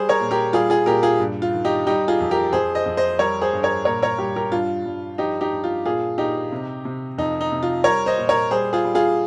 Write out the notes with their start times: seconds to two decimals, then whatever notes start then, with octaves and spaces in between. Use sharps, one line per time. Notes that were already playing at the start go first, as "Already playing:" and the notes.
Already playing: G3 G#4 C5
0.09 A#4 C#5
0.20 A#2
0.31 G4 A#4
0.53 G3 F4 G#4
0.70 F4 G#4
0.86 A#2 G4 A#4
1.03 F4 G#4
1.20 G2
1.42 F4
1.53 D#3
1.65 D#4 G4
1.87 G3 D#4 G4
2.08 F4 G#4
2.20 F2
2.31 G4 A#4
2.53 F2 G#4 C5
2.75 C5 D#5
2.86 F2
2.97 C5 D#5
3.19 G3 A#4 C#5
3.42 G#4 C5
3.53 G2
3.63 A#4 C#5
3.85 A#2 A#4 C#5
4.03 A#4 C#5
4.19 G3 G4 A#4
4.36 G4 A#4
4.52 G2 F4
4.85 G2
5.18 F3 D#4 G4
5.41 D#4 G4
5.53 G2
5.64 F4
5.85 A#2 F4 G#4
6.18 A#2 D#4 G4
6.52 C3
6.85 C3
7.18 F2 D#4
7.41 D#4
7.52 C3
7.63 F4
7.84 G3 A#4 C#5
8.06 C5 D#5
8.18 A#2
8.29 A#4 C#5
8.51 G3 G#4 C5
8.73 F4 G#4
8.85 G3
8.95 F4 G#4